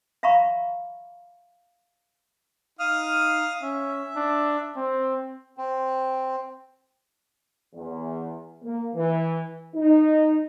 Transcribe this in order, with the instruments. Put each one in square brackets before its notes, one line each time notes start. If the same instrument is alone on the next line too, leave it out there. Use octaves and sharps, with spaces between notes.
[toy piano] E5 F5 A#5 B5 C#6
[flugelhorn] D#4 [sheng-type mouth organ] F5 D#6 F6
[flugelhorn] C#4 [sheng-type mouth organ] E5
[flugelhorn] D4
C4
[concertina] C4
[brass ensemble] E2
A#3
E3
D#4